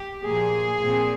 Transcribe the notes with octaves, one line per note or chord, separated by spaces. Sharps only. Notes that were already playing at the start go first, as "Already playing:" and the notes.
Already playing: G4
A#2 F3 A#3 G#4
A#2 F3 C4